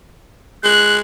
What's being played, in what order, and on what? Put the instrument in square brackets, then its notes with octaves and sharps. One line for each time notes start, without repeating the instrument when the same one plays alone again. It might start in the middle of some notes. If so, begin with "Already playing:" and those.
[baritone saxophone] G#3 [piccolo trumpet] F#6